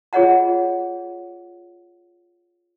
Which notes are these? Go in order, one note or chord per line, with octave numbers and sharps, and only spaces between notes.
F4 G#4 C#5 D#5 F#5 A#5